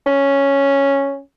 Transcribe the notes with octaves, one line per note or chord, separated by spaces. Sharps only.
C#4